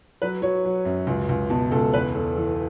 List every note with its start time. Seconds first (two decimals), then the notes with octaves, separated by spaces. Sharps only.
0.22 F#3 B4
0.42 F#3 C#5
0.65 F#3
0.85 F#2
1.07 C#2
1.29 C#2
1.50 B2 A5
1.71 C#2 A4
1.94 E2 B4
2.15 E2 A4
2.36 E3 A4